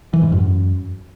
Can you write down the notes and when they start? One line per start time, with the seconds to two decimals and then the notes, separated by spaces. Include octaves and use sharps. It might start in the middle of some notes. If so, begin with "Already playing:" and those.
0.13 E3
0.23 G#2
0.32 F#2